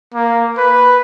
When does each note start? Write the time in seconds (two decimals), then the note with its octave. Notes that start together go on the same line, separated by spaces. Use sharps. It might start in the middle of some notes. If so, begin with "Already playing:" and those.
0.14 A#3
0.58 B4